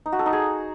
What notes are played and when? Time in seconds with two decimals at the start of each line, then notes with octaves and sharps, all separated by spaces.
0.06 D#4
0.12 F#4
0.19 A4
0.26 D#4
0.33 G#4